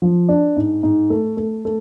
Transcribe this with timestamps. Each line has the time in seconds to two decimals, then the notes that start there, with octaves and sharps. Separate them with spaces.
0.02 F3
0.29 D4
0.57 G#2
0.83 G#2
1.10 A3
1.37 A3
1.65 A3